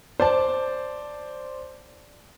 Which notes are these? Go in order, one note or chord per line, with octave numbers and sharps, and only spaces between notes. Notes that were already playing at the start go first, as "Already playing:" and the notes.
C5 D5 A5